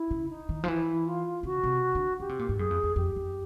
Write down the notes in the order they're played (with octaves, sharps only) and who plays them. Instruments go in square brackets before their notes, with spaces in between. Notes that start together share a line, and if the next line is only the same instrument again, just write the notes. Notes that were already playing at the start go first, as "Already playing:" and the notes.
Already playing: [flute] E4
[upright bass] C#3
[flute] D#4
[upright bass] D#3
F3
[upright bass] E3 [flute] E4
[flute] F4
[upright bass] C#3 [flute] F#4
[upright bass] C3
D3
[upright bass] D3 [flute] G4
[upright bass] C3
A#2
G#2
[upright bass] F#2 [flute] G#4
[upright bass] F2
E2
[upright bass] F2 [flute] G4
[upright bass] F#2